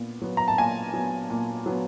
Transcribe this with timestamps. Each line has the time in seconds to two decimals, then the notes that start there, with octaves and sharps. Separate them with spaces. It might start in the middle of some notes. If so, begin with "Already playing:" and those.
Already playing: A#2 B3
0.22 F#3 B3
0.37 A#5
0.48 A5
0.58 A#2 G#5
0.94 F#3 B3
1.30 A#2
1.66 F#3 B3